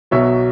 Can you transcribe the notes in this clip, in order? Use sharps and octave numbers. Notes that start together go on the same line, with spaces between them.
B1 B2 F#3 C#5 E5